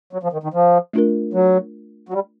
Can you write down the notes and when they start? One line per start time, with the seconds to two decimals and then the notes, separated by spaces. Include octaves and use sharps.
0.13 F#3
0.23 F3
0.33 D#3
0.43 D#3
0.54 F3
0.93 A3 D4 F4 A#4
1.34 F#3
2.09 F#3
2.14 G3